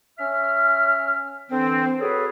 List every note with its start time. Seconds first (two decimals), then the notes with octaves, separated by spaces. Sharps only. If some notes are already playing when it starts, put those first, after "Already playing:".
0.18 C#4 E5 F6
1.50 D3 E3 C4
2.00 F#4 G#4 A4 B4 C#5